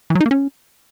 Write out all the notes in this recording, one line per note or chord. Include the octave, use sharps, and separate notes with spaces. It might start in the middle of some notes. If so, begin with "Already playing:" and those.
E3
F#3
D#4
A#3
C#4